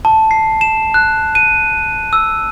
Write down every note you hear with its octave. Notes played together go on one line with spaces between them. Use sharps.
A5
C7
E7
F#6
D#7
E6